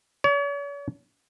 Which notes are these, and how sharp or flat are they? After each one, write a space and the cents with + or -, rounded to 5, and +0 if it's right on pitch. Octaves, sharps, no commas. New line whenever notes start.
C#5 +40